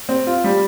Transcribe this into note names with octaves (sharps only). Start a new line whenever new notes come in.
C4
F4
G3